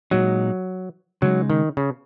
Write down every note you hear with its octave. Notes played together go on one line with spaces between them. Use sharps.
A#2 F#3 G#3 D#4
C#3 F#3 G#3 D#4
D#3
C#3